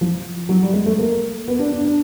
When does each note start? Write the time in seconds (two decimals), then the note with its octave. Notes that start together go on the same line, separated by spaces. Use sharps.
0.01 F3
0.49 F#3
0.62 G3
0.73 G#3
0.86 A3
0.98 A#3
1.48 B3
1.59 D4
1.72 D4
1.85 D4